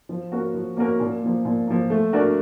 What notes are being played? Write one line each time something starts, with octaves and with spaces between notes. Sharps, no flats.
F3
A#3 C#4 F#4 A#4
F3
A#3 C#4 F#4 A#4
A#2
F3 A#3
A#2
F3 A#3
A3
D4 F#4 A#4 D5